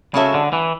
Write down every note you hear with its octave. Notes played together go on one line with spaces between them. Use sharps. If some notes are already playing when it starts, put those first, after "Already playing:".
C#3 G#3 C#4 F#4 A4 E5
D3
E3